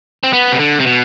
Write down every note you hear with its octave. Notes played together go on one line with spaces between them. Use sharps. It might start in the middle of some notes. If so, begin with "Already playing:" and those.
C4
B3
C3
D3
C3
B2